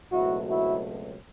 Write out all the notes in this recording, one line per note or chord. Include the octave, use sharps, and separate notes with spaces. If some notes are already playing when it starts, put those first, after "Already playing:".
C#2 B2 F#3 A3 C4 E4 F#4
E4 F#4